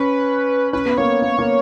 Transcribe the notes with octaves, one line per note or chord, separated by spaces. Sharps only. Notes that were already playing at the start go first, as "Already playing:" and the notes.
Already playing: C#4 B4
C#4 B4
B3
A#3 C#5
A#3
A#3